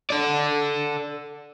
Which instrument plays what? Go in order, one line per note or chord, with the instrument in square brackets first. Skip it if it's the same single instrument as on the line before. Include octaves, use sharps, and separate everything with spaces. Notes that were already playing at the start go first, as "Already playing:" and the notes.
[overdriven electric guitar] A4 D5